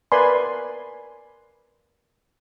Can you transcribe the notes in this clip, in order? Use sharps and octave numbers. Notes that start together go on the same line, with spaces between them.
A#4 B4 D5 G#5 B5 C6